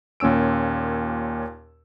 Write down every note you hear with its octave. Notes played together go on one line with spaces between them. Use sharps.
D#2 A#2 C#4 E6 D7